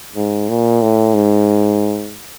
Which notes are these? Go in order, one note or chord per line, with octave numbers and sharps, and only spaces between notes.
G#2
A#2
A2
G#2